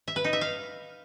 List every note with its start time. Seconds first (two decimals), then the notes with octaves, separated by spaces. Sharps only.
0.08 E5
0.16 B4
0.24 D#4
0.33 E5
0.41 F5